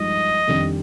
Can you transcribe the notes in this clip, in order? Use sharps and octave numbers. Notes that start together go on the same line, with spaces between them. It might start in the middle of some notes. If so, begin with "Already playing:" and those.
Already playing: G2 F3 G#3 D#4 D#5
F2 D#3 G3 D4 G4